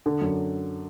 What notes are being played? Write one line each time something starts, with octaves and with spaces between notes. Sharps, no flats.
D3
F#2